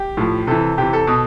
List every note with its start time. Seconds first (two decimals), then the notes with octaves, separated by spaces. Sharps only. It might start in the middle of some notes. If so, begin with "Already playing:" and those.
Already playing: G4
0.17 A2 F3
0.47 C3 E3 A4
0.78 C3 E3 G4
0.93 A4
1.07 B2